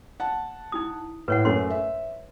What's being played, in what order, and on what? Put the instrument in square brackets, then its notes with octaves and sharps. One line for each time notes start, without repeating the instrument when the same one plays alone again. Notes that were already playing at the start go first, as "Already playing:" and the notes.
[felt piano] F#5 A5
[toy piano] D#4 E4 D#6
[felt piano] A2 [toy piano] B4 C#5 F#5
[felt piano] F#2 A3 [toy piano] C#5 F#5 C6
[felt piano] E5